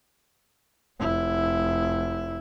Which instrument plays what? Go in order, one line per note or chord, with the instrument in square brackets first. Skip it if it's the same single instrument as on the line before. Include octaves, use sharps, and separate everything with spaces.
[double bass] F1 E4